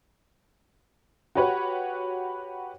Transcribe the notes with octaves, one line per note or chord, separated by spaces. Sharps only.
F#4 G4 B4 C#5 F#5